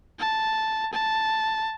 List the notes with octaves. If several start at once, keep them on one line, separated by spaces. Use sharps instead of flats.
A5
A5